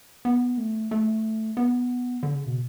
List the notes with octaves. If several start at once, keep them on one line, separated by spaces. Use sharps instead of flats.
B3
A3
A3
B3
D3
C#3
B2